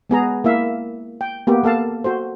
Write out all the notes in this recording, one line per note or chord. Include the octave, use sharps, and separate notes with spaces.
G#3 B3 G#4 A#5
A#3 E4 E5 F5
G5
A#3 B3 G4
A#3 A4 F5 A5
F#4 A4 C5